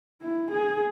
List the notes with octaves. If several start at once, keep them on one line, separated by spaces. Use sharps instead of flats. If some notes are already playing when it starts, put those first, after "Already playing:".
E4
G#4